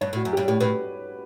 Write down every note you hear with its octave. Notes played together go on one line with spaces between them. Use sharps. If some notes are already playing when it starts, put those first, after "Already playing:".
G2 C#5
A2
F#4
F#2
G2 G4
A2 G4
A2 B4